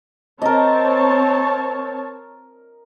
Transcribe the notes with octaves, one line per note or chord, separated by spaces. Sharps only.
C4 A#4 C#5 D#5 A5